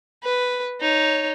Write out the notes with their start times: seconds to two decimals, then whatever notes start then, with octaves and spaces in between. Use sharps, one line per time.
0.24 B4
0.81 D#4 C#5